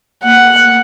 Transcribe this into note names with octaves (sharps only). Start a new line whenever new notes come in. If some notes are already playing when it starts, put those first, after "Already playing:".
A#3 F#5